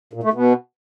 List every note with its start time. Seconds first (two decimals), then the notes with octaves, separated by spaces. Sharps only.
0.13 A#2
0.23 A3
0.33 B2